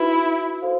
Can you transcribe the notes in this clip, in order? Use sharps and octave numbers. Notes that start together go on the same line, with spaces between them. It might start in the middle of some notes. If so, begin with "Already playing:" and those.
Already playing: D#4 E4 F#4 B4
F#4 A4 C5 F5